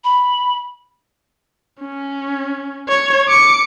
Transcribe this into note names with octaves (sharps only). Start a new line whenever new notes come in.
B5
C#4
C#5
D6 C#7